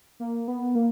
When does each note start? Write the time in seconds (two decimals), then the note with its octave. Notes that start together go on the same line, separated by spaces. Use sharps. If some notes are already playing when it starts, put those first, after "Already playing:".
0.20 A#3
0.48 B3
0.75 A#3